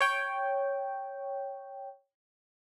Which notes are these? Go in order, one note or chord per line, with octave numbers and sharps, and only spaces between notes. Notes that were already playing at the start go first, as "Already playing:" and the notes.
C#5 G5